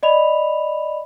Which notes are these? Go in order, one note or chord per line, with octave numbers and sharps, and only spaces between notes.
D5 D#5 B5 F7